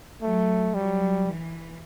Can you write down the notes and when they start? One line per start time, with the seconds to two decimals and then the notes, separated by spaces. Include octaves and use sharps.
0.22 F#3 A3
0.74 F#3 G3
1.28 E3